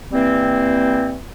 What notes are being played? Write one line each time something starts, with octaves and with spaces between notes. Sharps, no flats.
E3 G3 A#3 C4